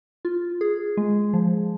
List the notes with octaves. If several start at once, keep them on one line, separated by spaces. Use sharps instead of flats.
F4
G#4
G#3
F3